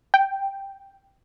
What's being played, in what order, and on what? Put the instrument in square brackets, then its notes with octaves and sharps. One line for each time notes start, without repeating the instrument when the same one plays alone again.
[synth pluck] G5